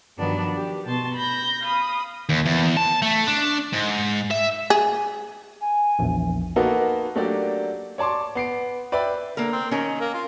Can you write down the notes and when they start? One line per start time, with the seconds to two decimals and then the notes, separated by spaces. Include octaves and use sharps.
0.18 G2 D#3 F3 F#3 B3 D4
0.57 G4
0.86 B2 A5 C6
1.16 B5 G6 A#6
1.64 F5 B5 D#6
2.29 D#2
2.46 E2
2.77 A5
3.02 A3
3.27 D4
3.73 G#2
4.31 E5
4.70 G#4
5.61 G#5
5.99 A#1 E2
6.56 A#3 B3 D#4 F#4 A4 A#4
7.15 F#3 A3 A#3 D4 G4 D5
7.98 C#5 D5 A5 C6 D6
8.35 B3 C7 D7
8.92 B4 D5 E5 G5 B5
9.37 D3 A#3 A#4
9.53 C4
9.71 D#3 C#4 A#4
10.01 A#3
10.14 F4